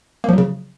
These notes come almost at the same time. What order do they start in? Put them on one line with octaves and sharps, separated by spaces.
A#3 F3 F#3 C#3